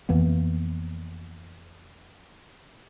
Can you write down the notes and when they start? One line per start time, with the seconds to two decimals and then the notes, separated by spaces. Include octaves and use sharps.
0.09 F2 E3 A#3 B3